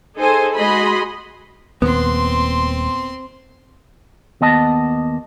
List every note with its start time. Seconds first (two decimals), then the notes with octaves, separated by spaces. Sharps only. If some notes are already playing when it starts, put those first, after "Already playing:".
0.15 D#4 G#4 A4 C5 G#5
0.56 G#3 F#4 G#4 D#5 B5 C6
1.82 D#1 D#2 B3 C4 C6
4.41 D#2 B3 D#5 A5